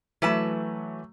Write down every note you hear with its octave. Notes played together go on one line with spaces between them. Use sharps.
E3 F#3 A3 B4 A5